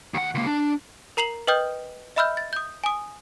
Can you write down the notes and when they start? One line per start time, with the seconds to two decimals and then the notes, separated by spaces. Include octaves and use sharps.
0.14 D#2 F#5
0.35 C#2 A#3
0.46 D4
1.17 A#4 A#5 C7 F7 F#7
1.47 B4 D#5 G5 D#6 F6 G6
2.16 D#5 E5 B5 E6 F6 G6
2.37 A6
2.53 D#6 G6
2.84 G#5 D#6